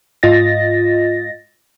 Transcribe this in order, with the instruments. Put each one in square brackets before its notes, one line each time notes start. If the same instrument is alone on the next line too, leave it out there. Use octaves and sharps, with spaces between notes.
[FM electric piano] G#2 F4 D#5 A6 A#6